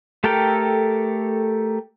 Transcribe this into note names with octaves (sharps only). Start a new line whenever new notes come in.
A3 G4 A4 A#4 G5